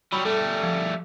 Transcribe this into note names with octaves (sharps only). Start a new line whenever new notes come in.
F#3 G3 B5
G3 A3 A4
F3